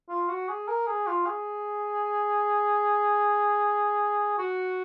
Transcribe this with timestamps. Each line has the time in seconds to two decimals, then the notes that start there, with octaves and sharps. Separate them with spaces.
0.09 F4
0.29 F#4
0.49 G#4
0.68 A#4
0.87 G#4
1.07 F4
1.26 G#4
4.38 F#4